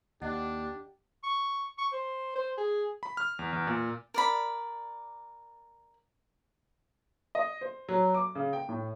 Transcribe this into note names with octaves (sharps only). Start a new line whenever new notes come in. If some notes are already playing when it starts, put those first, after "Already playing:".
D#2 D4 G4 D#5 F#5
C#6
C#6
C5
C5
G#4
B5
F6
E2
E2
A#2
A#4 D5 B5
D#5
C5
F#3
D6
C#3
G5
A2